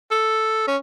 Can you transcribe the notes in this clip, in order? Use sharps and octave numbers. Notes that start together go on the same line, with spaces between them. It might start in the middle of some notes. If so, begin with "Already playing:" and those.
A4
C#4